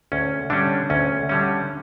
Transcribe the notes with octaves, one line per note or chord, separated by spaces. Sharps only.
D2 C#4
D3 G3 C#4 D4
D2 C#4
D3 G3 C#4